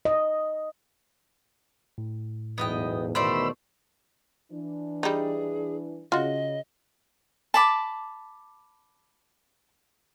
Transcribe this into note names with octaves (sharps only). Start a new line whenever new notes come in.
D#5
A2
B1 E2 G#2 B3 D#5 G5
E2 B2 D#3 A3 C5 D5 B5 E6
E3 D4
G3 D#4 G#4
C#3 F4 F#4 D#5
A5 B5 D6